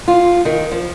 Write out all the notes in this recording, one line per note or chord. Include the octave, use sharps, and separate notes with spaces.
F4
D#3
F3